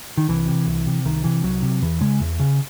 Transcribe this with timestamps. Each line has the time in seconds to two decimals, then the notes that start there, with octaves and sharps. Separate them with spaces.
0.17 D#3
0.28 C2 E3
0.47 C3
0.67 C2
0.87 C3
1.05 C2 D#3
1.24 C3 E3
1.43 C2 F#3
1.62 C3
1.82 E2 E3
2.01 C#3 G#3
2.20 E2
2.40 C#3